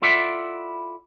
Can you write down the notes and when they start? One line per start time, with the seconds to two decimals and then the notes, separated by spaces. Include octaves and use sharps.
0.02 E4 F4 A4 D5 E5 F#5